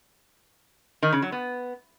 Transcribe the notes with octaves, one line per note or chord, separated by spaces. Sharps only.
D#3
C#3
F#3
B3